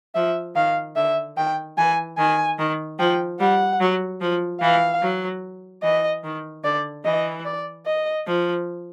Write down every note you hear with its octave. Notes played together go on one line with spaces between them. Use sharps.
F3 E5
D#3 F5
D3 E5
D#3 G5
E3 G#5
D#3 G#5
D#3
F3 G5
G3 F#5
F#3
F3
E3 F5
F#3
E3 D#5
D#3
D3 D5
E3 D#5
D5
D#5
F3